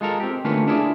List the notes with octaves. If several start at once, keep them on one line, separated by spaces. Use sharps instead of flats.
G#3 F4 A4 A#4
C4 G4
D3 A3 A#3 C#4 F4 B4
D4 E4 F4 G#4 C#5 D5